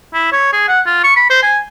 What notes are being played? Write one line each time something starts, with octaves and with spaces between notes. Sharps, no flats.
E4
C#5
G#4
F#5
F4
C#6
B5
C5
G#5